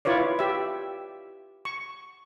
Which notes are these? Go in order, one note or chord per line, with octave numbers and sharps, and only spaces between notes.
E4 F4 B4 C#5 D5
G4 E5
C#6